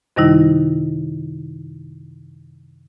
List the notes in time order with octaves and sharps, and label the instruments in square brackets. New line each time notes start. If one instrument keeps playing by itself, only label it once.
[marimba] F#2 C3 D#3 G3 D#4 E4